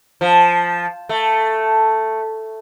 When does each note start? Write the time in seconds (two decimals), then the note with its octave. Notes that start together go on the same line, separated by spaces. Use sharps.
0.21 F3
1.09 A3